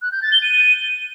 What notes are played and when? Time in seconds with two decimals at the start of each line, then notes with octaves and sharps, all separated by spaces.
0.02 F#6
0.12 G6
0.22 A6
0.32 G7
0.42 D#7